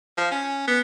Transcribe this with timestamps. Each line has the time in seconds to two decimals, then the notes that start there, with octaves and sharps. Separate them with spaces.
0.17 F3
0.31 C#4
0.68 B3